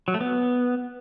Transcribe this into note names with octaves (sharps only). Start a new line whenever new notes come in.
F#3
A3
B3